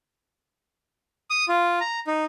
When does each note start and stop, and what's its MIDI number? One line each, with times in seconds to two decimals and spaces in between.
1.30 1.45 87
1.48 1.79 65
1.81 2.00 82
2.07 2.25 63